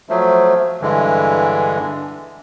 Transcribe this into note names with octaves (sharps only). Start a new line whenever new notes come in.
F3 F#3 A3
G2 D3 E3 G#3